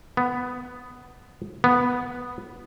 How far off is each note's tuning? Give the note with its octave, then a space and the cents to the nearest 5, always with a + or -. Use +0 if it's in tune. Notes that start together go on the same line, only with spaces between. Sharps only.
B3 +10
B3 +0